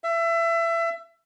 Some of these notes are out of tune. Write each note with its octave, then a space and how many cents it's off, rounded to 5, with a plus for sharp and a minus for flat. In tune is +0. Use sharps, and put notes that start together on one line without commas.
E5 +25